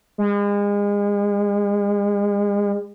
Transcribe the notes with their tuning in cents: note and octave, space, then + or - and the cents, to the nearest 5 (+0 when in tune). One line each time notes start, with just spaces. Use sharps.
G#3 -35